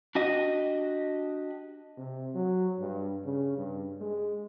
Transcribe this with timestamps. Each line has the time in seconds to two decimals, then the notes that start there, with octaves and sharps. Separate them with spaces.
0.15 D4 F#4 G4 D#5
1.97 C3
2.34 F#3
2.79 G2
3.25 C#3
3.57 G2
4.01 G#3